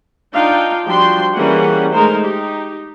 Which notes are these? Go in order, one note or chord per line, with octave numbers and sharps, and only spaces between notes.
D4 D#4 F4 F5 G5
F3 G3 D4 F#4 G5 C6
E3 G3 A#3 C#4 G#4 F#5
G#3 A3 D#4 A#4 C5
D#4 G4